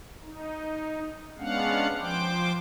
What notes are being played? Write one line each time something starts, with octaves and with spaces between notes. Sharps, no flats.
D#4
G#3 B3 C#4 D4 F5 F#5
F3 C5 G5 D6